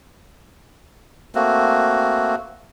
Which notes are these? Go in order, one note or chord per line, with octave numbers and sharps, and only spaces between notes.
A3 A#3 C4 F#4